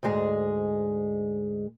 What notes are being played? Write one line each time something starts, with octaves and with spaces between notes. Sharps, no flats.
D2 G#2 G#3 G#4